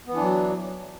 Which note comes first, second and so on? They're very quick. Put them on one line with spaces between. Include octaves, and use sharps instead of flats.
B3 E3 D4 F#3